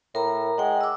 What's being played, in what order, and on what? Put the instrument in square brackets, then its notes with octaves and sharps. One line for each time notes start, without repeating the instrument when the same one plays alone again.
[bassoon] A2 [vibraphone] A#4 A#5
[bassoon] G#3 [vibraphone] F#5 G5
[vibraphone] D6 E6